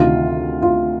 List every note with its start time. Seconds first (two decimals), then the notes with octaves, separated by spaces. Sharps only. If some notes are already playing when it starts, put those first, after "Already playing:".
Already playing: D2 C3 D#3 F4
0.62 F4